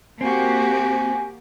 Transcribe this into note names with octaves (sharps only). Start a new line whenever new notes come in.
A#3 C4 F#4 G4 G#5